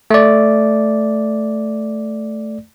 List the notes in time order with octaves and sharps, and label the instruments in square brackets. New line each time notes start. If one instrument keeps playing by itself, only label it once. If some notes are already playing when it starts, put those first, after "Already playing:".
[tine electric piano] A3 D5